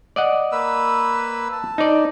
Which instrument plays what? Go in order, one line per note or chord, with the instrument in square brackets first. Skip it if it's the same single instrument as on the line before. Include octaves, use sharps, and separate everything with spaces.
[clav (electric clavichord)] D5 D#5 F#5
[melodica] A#3 B4 E6
A5
[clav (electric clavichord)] D#4 D5